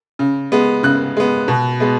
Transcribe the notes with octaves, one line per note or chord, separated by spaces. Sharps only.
C#3
G#3 B3
C#3 F#6
G#3 B3
B2
G#3 B3